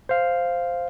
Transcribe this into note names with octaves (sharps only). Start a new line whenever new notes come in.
C5 F5